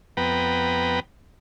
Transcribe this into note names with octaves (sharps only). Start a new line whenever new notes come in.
F2 B3 B4 G5 A#5